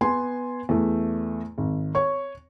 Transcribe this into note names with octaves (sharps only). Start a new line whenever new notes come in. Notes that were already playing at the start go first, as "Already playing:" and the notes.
B3 G#5 C6
E2 A3
G#1
C#5 C#6